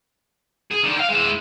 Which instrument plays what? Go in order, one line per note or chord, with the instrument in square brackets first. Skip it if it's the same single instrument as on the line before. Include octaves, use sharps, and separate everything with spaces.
[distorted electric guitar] G#4
D3 D#3
F5 G5
G#3 E4